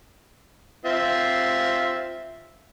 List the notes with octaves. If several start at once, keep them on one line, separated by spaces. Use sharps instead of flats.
C4 F4 E5